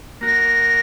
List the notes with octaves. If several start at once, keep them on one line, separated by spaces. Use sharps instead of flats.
A#3 F#4 A#4